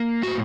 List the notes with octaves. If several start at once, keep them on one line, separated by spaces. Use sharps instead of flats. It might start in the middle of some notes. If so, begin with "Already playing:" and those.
Already playing: A#3
A2 F#4